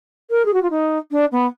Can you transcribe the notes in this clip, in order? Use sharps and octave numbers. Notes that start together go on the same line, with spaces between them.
A#4
G#4
F#4
F4
D#4
D4
B3